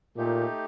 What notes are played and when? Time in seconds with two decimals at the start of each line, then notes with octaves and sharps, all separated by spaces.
0.16 A#2 A3 D#4 G4